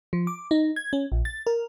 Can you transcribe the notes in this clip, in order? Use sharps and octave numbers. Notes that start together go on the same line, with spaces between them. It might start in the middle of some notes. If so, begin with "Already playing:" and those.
F3
D6
D#4
G#6
C#4
A#1
A6
A#4